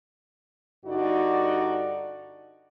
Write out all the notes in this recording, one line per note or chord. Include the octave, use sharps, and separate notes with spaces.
G2 D3 D#4 F#4 D5